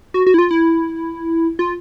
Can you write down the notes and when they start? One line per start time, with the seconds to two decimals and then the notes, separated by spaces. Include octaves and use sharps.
0.14 F#4
0.27 F#4
0.34 E4
0.39 F4
0.51 E4
1.59 F4